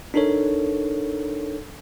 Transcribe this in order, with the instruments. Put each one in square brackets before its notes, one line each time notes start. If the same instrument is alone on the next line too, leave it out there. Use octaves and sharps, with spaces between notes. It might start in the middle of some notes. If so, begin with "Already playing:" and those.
[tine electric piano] D4 D#4 A4 A#4 C#5